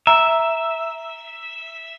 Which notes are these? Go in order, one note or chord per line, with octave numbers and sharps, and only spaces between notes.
E5 A#5